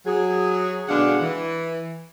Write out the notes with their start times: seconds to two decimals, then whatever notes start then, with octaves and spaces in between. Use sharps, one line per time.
0.06 F#3 G#4
0.89 B2 D3 G#3 D4 F5 F#5
1.22 E3